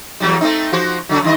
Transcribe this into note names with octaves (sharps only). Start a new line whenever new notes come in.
E2 F#3 G3
A3 C4 D#4
F3 F#4 C5
C#3 F#3
G2 D#3 D#5